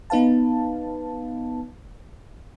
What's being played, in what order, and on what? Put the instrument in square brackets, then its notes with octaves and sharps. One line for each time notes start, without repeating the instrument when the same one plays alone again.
[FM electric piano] B3 D#4 B4 F5 A5